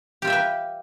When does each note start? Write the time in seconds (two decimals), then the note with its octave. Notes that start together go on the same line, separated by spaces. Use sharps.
0.22 G4
0.25 F4
0.27 E5
0.30 G5
0.32 B4